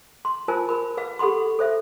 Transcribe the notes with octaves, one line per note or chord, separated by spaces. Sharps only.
C6
F4 A#4 C5 G#5 A5
A#4 B5
B4 F5
G4 A4 F#5 B5 C6
A4 C5 E5